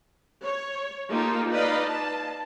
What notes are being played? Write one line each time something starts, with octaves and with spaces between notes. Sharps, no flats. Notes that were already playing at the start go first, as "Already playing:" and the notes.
C#5
A#3 D#4 F4 G4 A4
D#4 B4 D5 D#5 F5 B5
A5